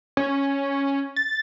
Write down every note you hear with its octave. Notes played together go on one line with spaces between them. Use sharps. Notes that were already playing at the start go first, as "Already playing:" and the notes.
C#4
A6